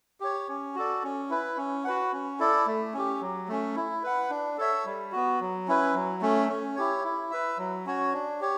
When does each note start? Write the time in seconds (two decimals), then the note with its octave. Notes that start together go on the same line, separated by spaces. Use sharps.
0.20 G4 C#5
0.49 C#4
0.75 F#4 A4 D5
1.03 C#4
1.30 E4 B4
1.57 C#4
1.84 F#4 B4 F#5
2.12 C#4
2.39 E4 A4 D5
2.66 A3
2.94 C#4 G4
3.21 F#3
3.48 A3 C#4
3.76 E4
4.03 B4 F#5
4.30 D4
4.58 A4 C#5 E5
4.85 G3
5.12 B3 F#4
5.40 F#3
5.68 C#4 E4 B4
5.94 F#3
6.21 A3 C#4
6.49 C#4
6.76 E4 G4 C#5
7.04 E4
7.31 B4 E5
7.58 F#3
7.86 C#4 F#4 C#5
8.13 D4
8.41 G4 C#5